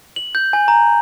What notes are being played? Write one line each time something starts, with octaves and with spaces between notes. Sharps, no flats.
F#7
G6
G#5
A#5